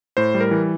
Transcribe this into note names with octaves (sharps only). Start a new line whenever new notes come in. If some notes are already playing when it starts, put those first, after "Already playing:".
A2 C5
G3
A#4
E3